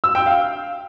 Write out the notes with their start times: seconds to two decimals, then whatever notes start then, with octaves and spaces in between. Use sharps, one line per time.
0.04 E6
0.15 G5
0.26 F5